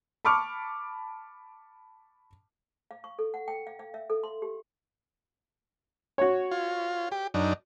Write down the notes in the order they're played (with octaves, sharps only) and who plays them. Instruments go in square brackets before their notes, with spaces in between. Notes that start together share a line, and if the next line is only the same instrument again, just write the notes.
[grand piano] A5 B5 C#6 D6 F6
[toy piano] F5
C#6
A4
F#5
G5
F5
F5
E5
A4
C6
G4
[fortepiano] F#4 C#5
[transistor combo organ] F4
G4
F#2 D4 D#4